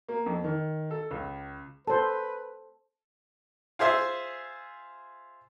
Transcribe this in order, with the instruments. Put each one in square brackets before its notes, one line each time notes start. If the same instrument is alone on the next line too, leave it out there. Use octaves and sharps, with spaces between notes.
[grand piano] A#3
F2
D#3
A4
C#2
[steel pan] A4 C5 [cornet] B4 [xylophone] A5
[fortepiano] F4 G#4 C5 E5